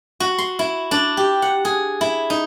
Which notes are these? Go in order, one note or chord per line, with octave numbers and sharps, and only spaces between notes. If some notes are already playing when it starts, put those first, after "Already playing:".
F#4
C6
E4
D4
G4
F#5
G#4
E4
D#4